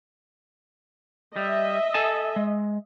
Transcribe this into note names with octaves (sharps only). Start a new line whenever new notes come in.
G3 D#5 E5
A4 G#5 A5
G#3